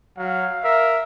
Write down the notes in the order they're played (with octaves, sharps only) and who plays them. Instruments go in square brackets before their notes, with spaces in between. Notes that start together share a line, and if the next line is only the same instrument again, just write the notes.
[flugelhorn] F#3 [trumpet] F5
[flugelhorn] A#4 [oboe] E5